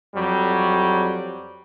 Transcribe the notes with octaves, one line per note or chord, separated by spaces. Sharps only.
F2 F#3 G3